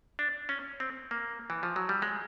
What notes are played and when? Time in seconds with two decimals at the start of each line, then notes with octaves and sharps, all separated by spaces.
0.19 D4
0.49 C#4
0.80 C4
1.11 A#3
1.50 E3
1.63 F3
1.76 F#3
1.89 G3
2.02 G#3